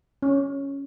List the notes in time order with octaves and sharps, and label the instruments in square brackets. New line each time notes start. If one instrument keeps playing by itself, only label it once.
[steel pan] C#4